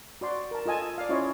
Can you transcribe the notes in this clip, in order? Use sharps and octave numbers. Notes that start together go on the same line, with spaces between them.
F#4 D5 C6
A#4 A5
F4 A4 D#5 G#5 A5
D5 F5
C#4 E4 F4 C#5 D#5